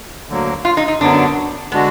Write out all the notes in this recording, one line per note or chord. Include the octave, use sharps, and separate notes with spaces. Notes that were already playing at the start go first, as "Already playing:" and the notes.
D2 D3 F#3 A#3
F4
D#4
D#4
F#2 D3 F#3 B3 D4
D3 G#3 B3 D4 F#4